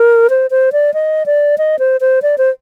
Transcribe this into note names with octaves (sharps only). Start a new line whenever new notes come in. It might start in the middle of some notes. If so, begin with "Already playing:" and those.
Already playing: A#4
C5
C5
D5
D#5
D5
D#5
C5
C5
D5
C5